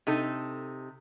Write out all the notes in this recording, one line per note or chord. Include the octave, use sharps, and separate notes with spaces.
C3 D#4 A4